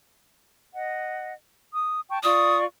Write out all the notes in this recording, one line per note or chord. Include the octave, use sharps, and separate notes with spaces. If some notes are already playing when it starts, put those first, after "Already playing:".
D#5 F#5
D#6
G5 A5 C#6
F4 D5 C#6 D#6